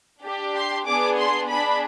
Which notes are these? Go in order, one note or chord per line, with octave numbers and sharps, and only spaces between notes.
D4 G4
C6
B3 D4 G#4 D6
C6
D4 G#4 B5